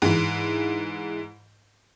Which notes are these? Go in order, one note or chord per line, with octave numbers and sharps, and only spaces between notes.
G#2 E3